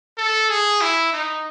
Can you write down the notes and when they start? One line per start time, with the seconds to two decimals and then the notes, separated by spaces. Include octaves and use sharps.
0.18 A4
0.50 G#4
0.81 E4
1.13 D#4